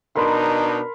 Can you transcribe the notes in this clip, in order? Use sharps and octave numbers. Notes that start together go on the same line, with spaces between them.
B2 D4 D#4 A#4 B5 C6